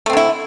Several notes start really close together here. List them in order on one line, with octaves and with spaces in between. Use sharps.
A3 C4 D3 E4